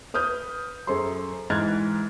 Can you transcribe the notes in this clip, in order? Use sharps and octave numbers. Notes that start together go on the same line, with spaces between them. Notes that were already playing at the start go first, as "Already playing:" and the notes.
B4 D#6 F6 G6
F#2 G#4 A4 C5 C6
G#2 E3 F6 F#6 G#6 A6